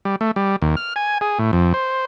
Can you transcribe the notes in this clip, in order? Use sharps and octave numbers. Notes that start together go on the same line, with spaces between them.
G3
A3
G3
D#2
F6
G#5
G#4
A2
F2
C5